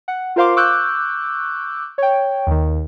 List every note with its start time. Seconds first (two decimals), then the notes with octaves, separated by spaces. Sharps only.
0.08 F#5
0.36 F4 A#4 C5 F5 C6 D6
0.56 C#6 D6 E6 F#6 G6
1.98 C#5 G5
2.47 D#2 D#3